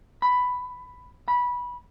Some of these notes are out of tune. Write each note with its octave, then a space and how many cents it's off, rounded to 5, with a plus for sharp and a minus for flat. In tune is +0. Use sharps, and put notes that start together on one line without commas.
B5 +5
B5 -15